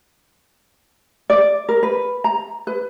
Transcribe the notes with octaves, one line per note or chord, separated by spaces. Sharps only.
D5
A#4
B4
A#5
B4